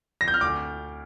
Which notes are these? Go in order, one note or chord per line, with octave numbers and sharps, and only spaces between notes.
A#6
G6
F6
D2 D6